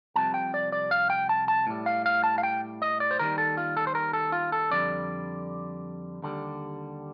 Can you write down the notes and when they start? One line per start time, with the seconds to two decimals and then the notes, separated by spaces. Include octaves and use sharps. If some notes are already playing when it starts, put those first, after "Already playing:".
0.16 C2 C3 F3 A5
0.34 G5
0.54 D5
0.72 D5
0.91 F5
1.10 G5
1.29 A5
1.48 A5
1.67 A2 G3
1.86 F5
2.06 F5
2.24 A5
2.38 F5
2.43 G5
2.82 D#5
3.00 D5
3.11 C5
3.19 D#2 D#3 G3 A#4
3.38 A4
3.57 F4
3.77 A4
3.87 C5
3.95 A#4
4.13 A4
4.32 F4
4.52 A4
4.71 F2 D3 G3 D5
6.22 D#2 D3 G3